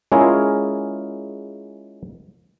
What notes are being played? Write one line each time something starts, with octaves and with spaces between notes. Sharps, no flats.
G#3 C#4 E4 F4 G#4 A#4